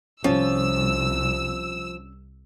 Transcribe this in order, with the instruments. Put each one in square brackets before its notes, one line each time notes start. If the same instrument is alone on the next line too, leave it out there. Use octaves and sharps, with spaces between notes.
[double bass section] C2 [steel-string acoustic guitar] F3 [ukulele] C#4 [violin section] E6